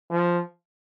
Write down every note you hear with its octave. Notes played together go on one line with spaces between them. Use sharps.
F3